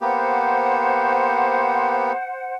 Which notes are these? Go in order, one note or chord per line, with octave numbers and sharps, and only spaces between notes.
A#3 B3 G4 C5 F#5